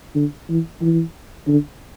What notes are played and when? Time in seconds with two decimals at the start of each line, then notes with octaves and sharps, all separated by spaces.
0.15 D3
0.49 E3
0.81 E3
1.47 D3